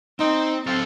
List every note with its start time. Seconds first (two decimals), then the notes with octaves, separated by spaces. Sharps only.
0.20 C4 D#4
0.67 C4 A4 F5